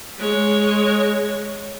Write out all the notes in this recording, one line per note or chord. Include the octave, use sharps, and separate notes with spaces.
G#3 C#5